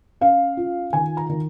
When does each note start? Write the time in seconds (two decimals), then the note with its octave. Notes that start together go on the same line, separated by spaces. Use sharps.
0.21 C#4 F5
0.57 F4
0.93 D#3 G#5
1.17 A#5
1.29 D#3